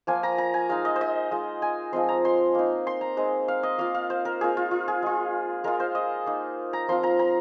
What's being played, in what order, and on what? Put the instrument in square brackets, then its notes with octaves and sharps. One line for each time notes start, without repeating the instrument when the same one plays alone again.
[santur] F3 A#3 F4 G#5
A#5
A#5
G#5
G#3 D#4 F5
D#5
C5
D#5
G#3 F4
G#5
F3 G#3 C4 C6
A#5
C6
A#3 D#4
C6
A#5
G#3 C4 D#4
F5
D#5
A#3 F4 F5
F5
C5
A#4
A#3 F4 G#4
F4
F4
G#4
G#3 F4
G#3 F4 A#4
C5
D#5
A#3 D#4
A#5
F3 C4 F4 C6
A#5
A#5